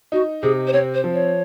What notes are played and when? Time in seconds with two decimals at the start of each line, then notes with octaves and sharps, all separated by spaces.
0.12 D#4 F#4
0.42 C3 G#4
0.67 C5
0.73 C4 C#5
0.94 C5
1.04 F3
1.14 C#5